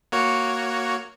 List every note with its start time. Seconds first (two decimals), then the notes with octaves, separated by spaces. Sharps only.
0.12 A#3 F#4 C#5